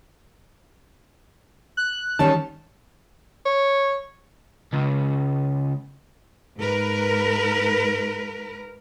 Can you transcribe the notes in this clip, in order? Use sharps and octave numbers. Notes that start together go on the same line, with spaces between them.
F#6
D#3 G3 C#4 A5
C#5
C#2
G#2 A#4 B4